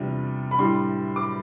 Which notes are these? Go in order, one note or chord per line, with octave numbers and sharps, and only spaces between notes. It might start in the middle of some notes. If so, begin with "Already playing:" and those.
Already playing: E2 C3 G3 D4 F4
B5
A2 G3 D4 C6
D6